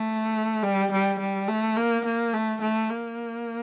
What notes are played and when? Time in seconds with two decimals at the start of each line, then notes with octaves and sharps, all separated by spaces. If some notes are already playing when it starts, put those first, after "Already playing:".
Already playing: A3
0.63 G3
0.91 G3
1.20 G3
1.48 A3
1.76 A#3
2.05 A#3
2.33 A3
2.61 A3
2.90 A#3